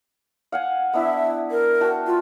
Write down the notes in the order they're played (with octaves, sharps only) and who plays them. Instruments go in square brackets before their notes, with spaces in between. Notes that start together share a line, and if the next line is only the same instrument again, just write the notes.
[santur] F5 F#5 G#5
[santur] B3 D4 E4 [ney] E5
[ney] A#4
[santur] F#4 G5 A5
[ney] F4